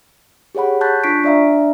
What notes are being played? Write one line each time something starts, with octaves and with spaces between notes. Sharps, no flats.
G4 G#4 C#5 F#5 B5
A5 C#6 F#6 G6 A6 B6
D4 F4 C#6 B6 C7 D7
D4 D5 E5 F5 A#5